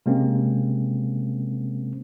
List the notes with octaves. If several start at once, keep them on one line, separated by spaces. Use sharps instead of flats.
C3 G#3 A#3 C4 C#4